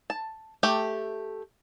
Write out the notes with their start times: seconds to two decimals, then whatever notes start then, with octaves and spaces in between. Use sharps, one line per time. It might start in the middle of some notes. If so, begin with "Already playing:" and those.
0.10 A5
0.63 A3 G4 A4 G5